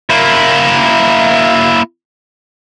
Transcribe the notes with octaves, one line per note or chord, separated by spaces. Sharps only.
A#3 E4